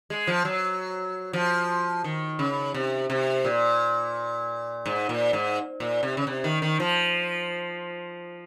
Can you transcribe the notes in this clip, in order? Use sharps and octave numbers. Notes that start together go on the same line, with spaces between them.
G#3
F3
F#3
F3
D#3
C#3
C3
C3
A#2
G#2
A#2
G#2
A#2
C3
C#3
C3
D#3
D#3
F3